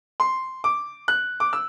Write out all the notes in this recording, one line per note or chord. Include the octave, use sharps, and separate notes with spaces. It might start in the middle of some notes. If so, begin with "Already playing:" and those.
C6
D6
F#6
D6
E6